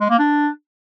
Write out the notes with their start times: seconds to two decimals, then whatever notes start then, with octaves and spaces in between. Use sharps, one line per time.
0.01 G#3
0.10 A#3
0.19 D4